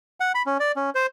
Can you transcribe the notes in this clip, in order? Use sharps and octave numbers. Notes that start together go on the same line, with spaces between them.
F#5
B5
C#4
D5
C#4
C5